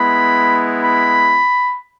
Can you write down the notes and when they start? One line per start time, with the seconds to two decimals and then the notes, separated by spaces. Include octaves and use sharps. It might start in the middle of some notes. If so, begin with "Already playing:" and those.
Already playing: G#3 B3 E4 B5
0.82 B5